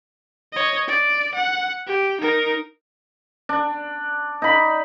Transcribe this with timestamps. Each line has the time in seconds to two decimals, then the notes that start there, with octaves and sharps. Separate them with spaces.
0.53 C#5 D#5
0.88 D5
1.35 F#5
1.87 G4
2.21 D#4 A#4
3.49 D4
4.42 D#4 B5